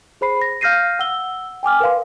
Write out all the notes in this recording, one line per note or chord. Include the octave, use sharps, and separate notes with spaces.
G#4 C5 B5 C7
A#6
F5 F6 G6 A#6 C7 D#7
F#5 E6 G7
G5 G#5 D6 F6
A#4 B4 F5 C6